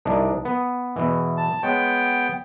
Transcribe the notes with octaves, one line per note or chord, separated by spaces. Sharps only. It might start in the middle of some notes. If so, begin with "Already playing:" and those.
C2 D4 D#4
B3
E2 B2 E3
A5
G#3 B3 C#5 G5